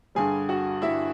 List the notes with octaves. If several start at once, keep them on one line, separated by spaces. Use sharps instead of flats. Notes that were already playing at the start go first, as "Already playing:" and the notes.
G2 D3 G3 G#4 G#5
F#4 F#5
G2 D3 G3 E4 E5